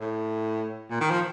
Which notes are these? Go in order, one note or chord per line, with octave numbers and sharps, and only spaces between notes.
A2
A#2
D#3
F3